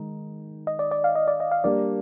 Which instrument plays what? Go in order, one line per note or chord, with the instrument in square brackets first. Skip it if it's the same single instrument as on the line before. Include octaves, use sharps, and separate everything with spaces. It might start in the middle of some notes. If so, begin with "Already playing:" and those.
Already playing: [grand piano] D#3 G#3 D#4
[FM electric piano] D#5
D5
D5
F5
D#5
D5
D#5
F5
[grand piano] G3 A#3 D4 G4 [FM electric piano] D5